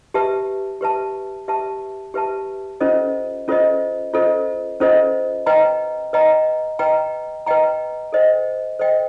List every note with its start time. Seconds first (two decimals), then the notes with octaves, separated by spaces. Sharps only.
0.14 G4 B4 E5 A5
0.81 G4 B4 E5 A5
1.48 G4 B4 E5 A5
2.14 G4 B4 E5 A5
2.80 C#4 F4 A4 C5 D#5
3.48 C#4 F4 A4 C5 D#5
4.13 C#4 F4 A4 C5 D#5
4.80 C#4 F4 A4 C5 D#5
5.46 B4 D#5 G5 A#5
6.13 B4 D#5 G5 A#5
6.79 B4 D#5 G5 A#5
7.46 B4 D#5 G5 A#5
8.12 A4 C5 D#5 G5
8.79 A4 C5 D#5 G5